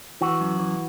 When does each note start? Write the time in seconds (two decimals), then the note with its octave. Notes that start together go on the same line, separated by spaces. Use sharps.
0.21 E3 F#4
0.41 F#2
0.59 E3